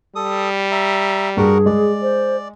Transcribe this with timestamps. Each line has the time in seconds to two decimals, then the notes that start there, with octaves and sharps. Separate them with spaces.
0.15 G3 A4 D#6
0.72 E5 A#5
1.37 G2 F#4 G#4 A#4 F#5
1.66 G#3 D5
2.02 C5